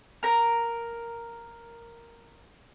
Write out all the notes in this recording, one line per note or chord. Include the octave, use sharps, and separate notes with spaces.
A#4 A#5